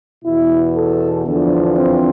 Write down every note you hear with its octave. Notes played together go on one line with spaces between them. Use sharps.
E2 B2 E4
A4
E2 D3 F3 D4
C4